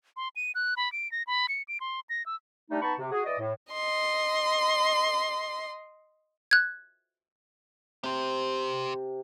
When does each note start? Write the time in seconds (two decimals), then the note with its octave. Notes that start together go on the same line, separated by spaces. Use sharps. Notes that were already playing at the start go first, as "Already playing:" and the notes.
0.17 C6
0.36 D#7
0.55 F#6
0.77 B5
0.92 D7
1.12 A#6
1.27 B5
1.49 C#7
1.68 D7
1.80 C6
2.10 A#6
2.26 E6
2.70 G3 A3 D4 D#4
2.82 B3 D#4 A5 B5 C#6
2.99 C3
3.10 F#4 G#4
3.25 E3 D5 D#5
3.39 A2
3.73 D#5 C6
6.51 F#6 G#6
8.04 C3 G4 C5